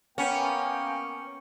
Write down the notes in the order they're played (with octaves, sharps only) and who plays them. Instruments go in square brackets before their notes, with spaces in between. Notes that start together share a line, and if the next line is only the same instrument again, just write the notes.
[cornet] A#3 [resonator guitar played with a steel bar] B3 [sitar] C#4 [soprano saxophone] G5